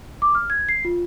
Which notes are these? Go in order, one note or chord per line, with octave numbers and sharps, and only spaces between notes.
D6
F6
G#6
C7
F4